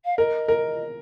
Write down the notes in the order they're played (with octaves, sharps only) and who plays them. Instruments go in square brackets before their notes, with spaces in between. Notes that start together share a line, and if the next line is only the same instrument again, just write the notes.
[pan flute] F5
[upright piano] A#4 [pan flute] D#5
[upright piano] A#4